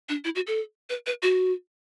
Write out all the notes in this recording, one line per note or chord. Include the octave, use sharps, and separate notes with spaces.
D4
E4
F#4
A4
B4
B4
F#4